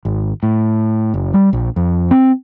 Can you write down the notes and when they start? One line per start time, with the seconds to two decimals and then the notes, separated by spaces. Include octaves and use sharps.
0.05 G#1
0.43 A2
1.14 F#1
1.34 G3
1.53 A#1
1.76 F2
2.11 C4